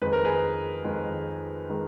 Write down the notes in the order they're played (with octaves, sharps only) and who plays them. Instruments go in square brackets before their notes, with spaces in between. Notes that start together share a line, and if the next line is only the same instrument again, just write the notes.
[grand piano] F2 D#3 G#3 B4
A#4
G#4 B4
F2 D#3 G#3
D#3 G#3